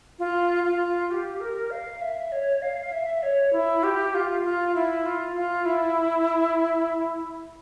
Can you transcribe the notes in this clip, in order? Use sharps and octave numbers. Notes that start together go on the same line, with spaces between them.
F4
F4
G4
A#4
F5
E5
C#5
F5
E5
C#5
E4
G4
F4
F4
E4
F4
F4
E4